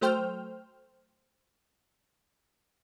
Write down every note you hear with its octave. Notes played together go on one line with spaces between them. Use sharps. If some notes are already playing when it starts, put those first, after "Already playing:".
F#3 A3 C5 G5 F6